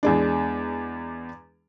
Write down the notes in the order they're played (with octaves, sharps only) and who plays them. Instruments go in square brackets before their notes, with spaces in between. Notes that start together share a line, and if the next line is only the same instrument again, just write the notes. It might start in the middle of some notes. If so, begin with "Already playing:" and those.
[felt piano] E2 G#3 D4